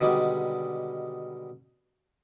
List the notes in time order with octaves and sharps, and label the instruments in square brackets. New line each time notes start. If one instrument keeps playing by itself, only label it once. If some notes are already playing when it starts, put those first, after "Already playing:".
[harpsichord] B2 D3 D#3 G3 G#3